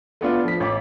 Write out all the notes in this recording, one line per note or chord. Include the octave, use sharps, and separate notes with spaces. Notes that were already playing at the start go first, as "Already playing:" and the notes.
A3 B3 D4 F4
F3 B6
A1 D6